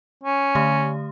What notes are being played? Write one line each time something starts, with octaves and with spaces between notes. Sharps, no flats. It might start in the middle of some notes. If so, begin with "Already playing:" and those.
C#4
D3 A3 G4